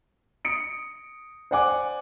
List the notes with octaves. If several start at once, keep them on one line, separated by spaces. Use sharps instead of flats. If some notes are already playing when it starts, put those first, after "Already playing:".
D#6 C#7 D7
C5 D5 F#5 G#5 D6